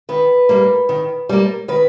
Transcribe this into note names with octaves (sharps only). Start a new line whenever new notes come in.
D#3 B4
G3 A#3
D#3
G3 A#3
D#3 B4